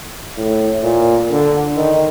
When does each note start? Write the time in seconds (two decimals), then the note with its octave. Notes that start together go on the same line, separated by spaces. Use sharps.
0.37 A2
0.83 A#2
1.30 D3
1.76 D#3